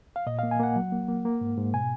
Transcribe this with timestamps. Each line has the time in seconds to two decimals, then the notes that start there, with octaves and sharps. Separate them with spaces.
0.16 F5
0.26 A#2 D#5
0.39 F5
0.43 A#3
0.51 G#5
0.59 A#3 F#5
0.76 F#3
0.92 A#3
1.08 A#3
1.25 A#3
1.41 G#2
1.58 G#2
1.74 B2 G#5